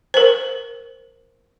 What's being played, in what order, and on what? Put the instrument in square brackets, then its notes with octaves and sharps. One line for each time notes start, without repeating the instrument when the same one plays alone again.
[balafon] A#4 C5